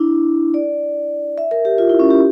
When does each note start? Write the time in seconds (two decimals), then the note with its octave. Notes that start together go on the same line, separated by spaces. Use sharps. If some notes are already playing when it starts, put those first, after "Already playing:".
Already playing: D4 E4
0.54 D5
1.38 E5
1.51 A#4
1.65 G4
1.78 F4
1.89 E4
1.99 C#4
2.11 G4